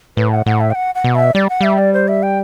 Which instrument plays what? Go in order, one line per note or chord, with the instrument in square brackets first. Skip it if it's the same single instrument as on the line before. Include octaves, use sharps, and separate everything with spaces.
[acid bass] A2 [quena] B4
[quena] F#5
[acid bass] A2 [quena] F#5
[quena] E5
G5
F#5
F#5
[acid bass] B2
[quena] E5
[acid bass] G3 [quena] D5
[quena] F#5
[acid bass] G3 [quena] E5
[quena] D5
C5
E5
G5